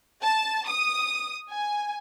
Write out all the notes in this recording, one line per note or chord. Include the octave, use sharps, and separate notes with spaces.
A5
D#6
G#5